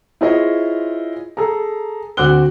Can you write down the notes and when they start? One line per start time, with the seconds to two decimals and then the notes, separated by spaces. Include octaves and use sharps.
0.21 E4 F4 G#4 C5 C#5 D#5
1.37 G#4 A4 A#5
2.17 D2 C4 F#4 D6 F#6 G7